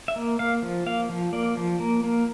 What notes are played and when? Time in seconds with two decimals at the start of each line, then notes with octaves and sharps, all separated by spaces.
0.08 E5
0.16 A#3
0.39 A#3 F5
0.63 F3
0.86 A#3 F5
1.09 F3
1.33 A#3 D5
1.57 F3
1.80 A#3
2.04 A#3